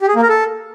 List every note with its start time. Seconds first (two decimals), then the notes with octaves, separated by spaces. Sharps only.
0.01 G4
0.08 G#4
0.15 A#3
0.22 A#4
0.29 A4